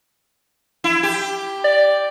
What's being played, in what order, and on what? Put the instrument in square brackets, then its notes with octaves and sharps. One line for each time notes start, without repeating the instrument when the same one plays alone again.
[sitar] E4
G4
[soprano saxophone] D5